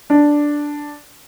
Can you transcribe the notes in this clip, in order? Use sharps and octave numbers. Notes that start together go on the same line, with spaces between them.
D4